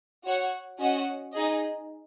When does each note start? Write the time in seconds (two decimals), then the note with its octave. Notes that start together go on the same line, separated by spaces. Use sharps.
0.25 F#4 C#5 F#5
0.79 C#4 F#4 D#5 F#5
1.33 D#4 G#4 D#5